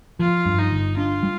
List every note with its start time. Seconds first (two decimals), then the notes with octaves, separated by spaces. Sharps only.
0.19 F3 F4
0.46 G2
0.58 D#4
0.71 G1
0.97 D4 F4
1.23 G3